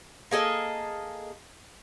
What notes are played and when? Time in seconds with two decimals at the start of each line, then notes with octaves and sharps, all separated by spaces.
0.31 A#3 G#4 A4 D#5